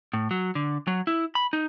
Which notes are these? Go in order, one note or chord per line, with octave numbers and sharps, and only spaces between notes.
A2
F#3
D3
F#3
E4
B5
D#4